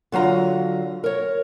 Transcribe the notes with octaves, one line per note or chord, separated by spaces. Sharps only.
D3 F#3 F4 A#5
A#4 C#5